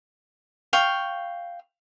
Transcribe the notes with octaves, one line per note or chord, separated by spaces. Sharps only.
F5 G5 C#6